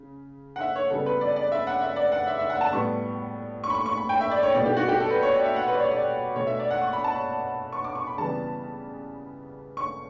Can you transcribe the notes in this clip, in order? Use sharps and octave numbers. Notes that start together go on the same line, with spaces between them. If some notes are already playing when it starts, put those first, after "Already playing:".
Already playing: C#3
F#5
E5
C#5
C#3 G3 B3 A4
B4
D5
D5
E5
F#5
E5
D5
F#5
E5
E5
F#5
A5
A2 G3 B3 C#6
C#6
B5
C#6
C#6
B5
G5
E5
D5
C#5
B2 G3 B3 D5
G4
F#4
G4
A4
B4
C#5
D5
E5
F#5
B4
D5
C#5
D5
B2 A3 C#5
E5
D5
F#5
C#6
B5
A5
B5
C#6
D6
C#6
B5
C#3 E3 G3 B3 A5
C#6